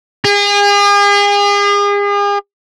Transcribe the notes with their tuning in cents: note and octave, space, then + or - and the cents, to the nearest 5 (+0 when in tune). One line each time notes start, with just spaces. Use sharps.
G#4 -40